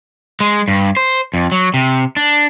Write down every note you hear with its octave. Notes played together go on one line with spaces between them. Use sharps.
G#3
G2
C5
F2
F#3
C3
D4